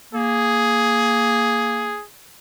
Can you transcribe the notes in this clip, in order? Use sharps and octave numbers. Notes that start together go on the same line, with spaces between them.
A#3 G#4